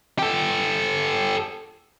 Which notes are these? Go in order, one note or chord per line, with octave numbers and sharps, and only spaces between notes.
G4 A4